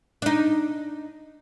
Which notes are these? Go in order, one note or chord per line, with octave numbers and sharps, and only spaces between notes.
D4 D#4